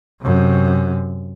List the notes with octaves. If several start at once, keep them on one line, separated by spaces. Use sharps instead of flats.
F#2 C3